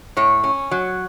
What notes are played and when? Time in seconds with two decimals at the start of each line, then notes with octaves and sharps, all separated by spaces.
0.17 A2 C#5
0.44 C#4
0.71 F#3